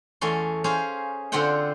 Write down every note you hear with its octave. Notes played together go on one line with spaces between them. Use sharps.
E2 A3 C#4 C6
C#4 G#4 C5 F5
D3 C4 F4 C5 F#5 G5